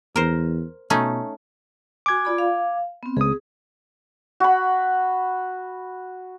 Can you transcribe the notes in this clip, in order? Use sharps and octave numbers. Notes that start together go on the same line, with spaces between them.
E2 A#4 C5
B2 A3 C#4 D#4
F#4 G#5 D6 G#6
F4 D5 B5
F5
B3 C4
C#2 G#4 D#6
F#4 B5